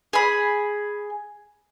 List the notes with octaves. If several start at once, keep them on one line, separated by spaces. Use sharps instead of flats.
G#4 B5